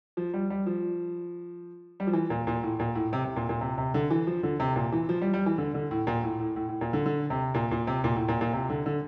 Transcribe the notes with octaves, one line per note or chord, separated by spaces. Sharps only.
F3
G3
G3
F3
G3
F3
E3
A#2
A#2
A2
A#2
A2
C3
C3
A#2
A#2
C3
C3
D3
E3
F3
D3
C3
A#2
E3
F3
G3
G3
E3
D3
D3
A2
A#2
A2
A2
A2
A2
A#2
D3
D3
C3
A#2
A#2
C3
A#2
A2
A#2
A#2
C3
D3
D3